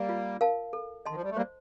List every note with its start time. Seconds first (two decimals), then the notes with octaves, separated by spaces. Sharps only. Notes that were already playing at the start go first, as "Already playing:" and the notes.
Already playing: G3 A#3
0.09 F4
0.41 A#4 F5 A5
0.73 A4
1.06 D#3 D#5 A5 C6
1.15 F3
1.23 G3
1.30 A3
1.36 G3 A#3 C5